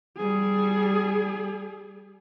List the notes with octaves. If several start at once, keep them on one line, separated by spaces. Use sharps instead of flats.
G3 G#4